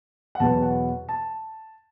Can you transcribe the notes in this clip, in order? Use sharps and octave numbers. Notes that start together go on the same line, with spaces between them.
F#5
E2 B2 F#3 B3 A5
F#5
A5